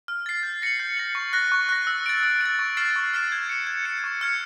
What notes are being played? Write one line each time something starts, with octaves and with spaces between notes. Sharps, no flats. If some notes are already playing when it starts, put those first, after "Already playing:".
F6
A6 C7
G6
A#6 C#7 F#7
G6
A#6 C#7 F#7
C#6
F#6 A#6
C#6
F#6 A#6
E6
A6 D7
E6
A6 D7
C#6
F6 A6 C7 E7
C#6
F6 A6 C7 E7
G#6
C#7 E7
G#6
C#7 E7
C#6
F6 G#6 C#7